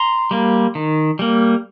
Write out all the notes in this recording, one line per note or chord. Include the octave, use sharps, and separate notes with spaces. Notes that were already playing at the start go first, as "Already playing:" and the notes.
Already playing: A#5 C6
G3 A#3
D#3
G3 A#3